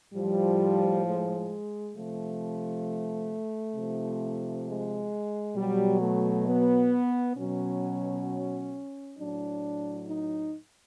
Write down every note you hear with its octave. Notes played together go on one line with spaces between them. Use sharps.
A2 F3 G3
G#3
C3 F3 A3
C3 F3
G#3
B2 F#3 G3
A3
B3
B2 F#3 C#4
A2 F#3 D4
D#4